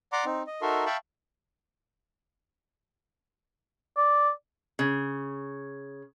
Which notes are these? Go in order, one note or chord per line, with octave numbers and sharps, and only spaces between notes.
D5 F#5 A#5 C6 D6
C4 D#4
D#5
D#4 F#4 A4 A#4 E5 C6
E5 F5 G5 A5 B5 C#6
D5
C#3